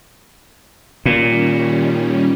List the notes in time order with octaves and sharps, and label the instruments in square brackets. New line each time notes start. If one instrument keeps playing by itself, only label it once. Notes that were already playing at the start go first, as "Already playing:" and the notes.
[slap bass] A#2 [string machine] D#3 G3 C#4